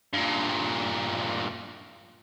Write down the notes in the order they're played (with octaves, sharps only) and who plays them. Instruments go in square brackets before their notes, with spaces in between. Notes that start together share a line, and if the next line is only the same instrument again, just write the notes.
[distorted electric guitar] G2 A#2